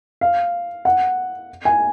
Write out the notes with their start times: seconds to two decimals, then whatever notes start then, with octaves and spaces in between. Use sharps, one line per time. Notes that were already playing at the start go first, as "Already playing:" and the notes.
0.21 F5
0.85 F#5
1.65 G#5